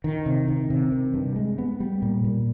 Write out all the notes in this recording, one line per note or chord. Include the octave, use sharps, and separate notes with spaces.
D#3
C3
D#3
C3
D#3
G2
G#3
B3
G3
A#2
A#2